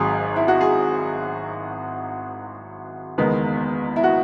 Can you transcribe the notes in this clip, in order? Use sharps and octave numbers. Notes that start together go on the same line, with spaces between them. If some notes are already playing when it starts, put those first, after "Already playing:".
Already playing: G#1 G#2 F#3 G#4
E4
F#4
G#4
F#1 E2 D#3 G#3 B3
E4
F#4